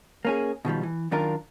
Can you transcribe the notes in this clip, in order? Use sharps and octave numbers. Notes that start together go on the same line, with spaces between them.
A#3 C#4 G#4
B2 D#3 F3 G3
E3
F#2 D#3 D4 F4 A#4